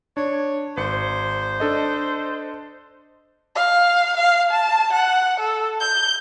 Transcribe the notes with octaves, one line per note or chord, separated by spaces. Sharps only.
D4 C#5
G#1 C5 C#7
D4 A4 D#5
F5
F5
A5
F#5
A4
G6